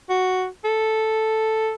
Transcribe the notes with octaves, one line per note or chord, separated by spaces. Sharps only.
F#4
A4